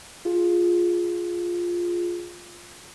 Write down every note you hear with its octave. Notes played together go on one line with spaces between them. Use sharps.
F4 G#4